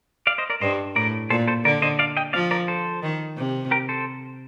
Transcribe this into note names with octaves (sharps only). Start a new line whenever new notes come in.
D5 F5
C5 D#5
A#4 D5
G2 C5 D#5
A2 A#4 D5
A#2 A4 C5
A4 C5
D3 A#4 D5
C5 D#5
D5 F5
D#5 G5
F3 D5 F5
A#4 D5
A4 C5
D#3
C3
G4 A#4
A4 C5